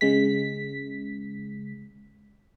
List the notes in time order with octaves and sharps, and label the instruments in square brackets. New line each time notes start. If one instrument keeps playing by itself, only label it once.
[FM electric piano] C#3 G#3 B6